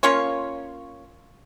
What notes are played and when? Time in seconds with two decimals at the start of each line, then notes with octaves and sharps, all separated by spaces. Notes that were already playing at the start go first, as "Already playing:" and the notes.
0.03 A#3 C#4 F4 C#5